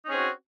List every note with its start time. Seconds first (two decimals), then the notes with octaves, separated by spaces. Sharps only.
0.05 D#4
0.07 C#4
0.10 G#4
0.13 C4
0.16 F#4